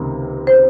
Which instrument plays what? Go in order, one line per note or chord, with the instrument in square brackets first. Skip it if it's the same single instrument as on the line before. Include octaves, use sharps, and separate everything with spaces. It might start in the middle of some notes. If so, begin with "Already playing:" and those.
Already playing: [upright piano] C#2 C3 D#3 A#3
[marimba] C5